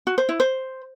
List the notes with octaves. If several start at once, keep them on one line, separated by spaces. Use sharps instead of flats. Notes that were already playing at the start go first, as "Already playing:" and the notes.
F#4
C5
E4
C5